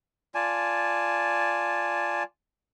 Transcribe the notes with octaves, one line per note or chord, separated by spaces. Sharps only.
F4 D5 G#5 A5